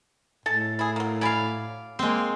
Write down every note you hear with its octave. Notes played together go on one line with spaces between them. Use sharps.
A2 G#3 A4 A5
E4 G#4
F#3 A#3
F#3 D5 F5 G#5 B5
G#3 A#3 C4